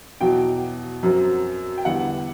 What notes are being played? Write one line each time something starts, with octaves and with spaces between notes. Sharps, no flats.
E2 B2 F#3 G5
F#2 F#3 C4
G5
E2 D3 G3 B3 F#5